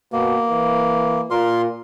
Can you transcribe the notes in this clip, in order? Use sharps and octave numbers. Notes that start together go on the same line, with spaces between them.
B2 A#3
E3
A#2 A#4 C6